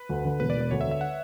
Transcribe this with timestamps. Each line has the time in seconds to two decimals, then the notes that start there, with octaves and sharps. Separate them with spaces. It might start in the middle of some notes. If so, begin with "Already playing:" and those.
Already playing: B4
0.09 D2
0.25 D3
0.40 E1 B4
0.50 D5
0.56 E1
0.61 D5
0.71 D2 C#5
0.81 E5
0.86 D3
0.91 E5
1.01 F#5